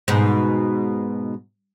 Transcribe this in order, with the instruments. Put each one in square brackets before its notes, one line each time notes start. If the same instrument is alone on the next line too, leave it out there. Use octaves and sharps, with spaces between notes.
[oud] G#2 B2